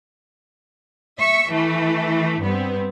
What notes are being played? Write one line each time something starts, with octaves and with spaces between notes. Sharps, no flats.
E5 C#6
E3 A3
G2 B3 C4